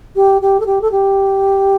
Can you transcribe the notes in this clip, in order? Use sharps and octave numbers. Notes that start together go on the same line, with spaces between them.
G4
G4
A4
G4
A4
G4